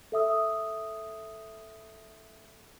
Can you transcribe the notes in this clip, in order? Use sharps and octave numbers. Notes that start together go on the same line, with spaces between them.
A4 E5 D#6 E6